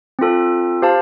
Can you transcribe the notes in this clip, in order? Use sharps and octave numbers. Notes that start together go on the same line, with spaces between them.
C4 F4 A4
G4 C5 F5 A5